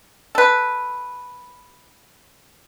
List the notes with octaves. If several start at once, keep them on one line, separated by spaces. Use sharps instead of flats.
A4 B4